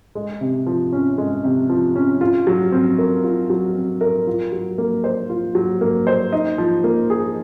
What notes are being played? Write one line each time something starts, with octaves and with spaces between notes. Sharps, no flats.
G#3
C3
F3
C#4
G#3
C3
F3
C#4
F4
F#3
C4
A#4
F4
F#3
C4
A#4
F4
F#3
A#3
C5
F4
F#3
A#3
C5
D#4
F3
A#3
G#4